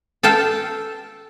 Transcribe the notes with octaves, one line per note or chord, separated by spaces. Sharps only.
A4 F5 G5 A5